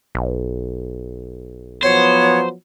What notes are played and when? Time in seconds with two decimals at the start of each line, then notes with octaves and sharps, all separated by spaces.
0.15 B1
1.83 F3 F#3 B3 C5 C#5